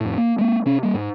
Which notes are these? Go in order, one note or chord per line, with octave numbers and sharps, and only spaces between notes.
F2 A2
A#3
G#3 A#3
C3 C#4
G3 A#3
G#2